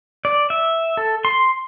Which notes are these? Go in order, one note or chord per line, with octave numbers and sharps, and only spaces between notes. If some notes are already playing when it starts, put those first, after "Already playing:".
D5
E5
A4
C6